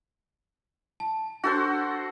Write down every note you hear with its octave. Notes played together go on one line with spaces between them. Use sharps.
A5
D4 F#4 A4 C5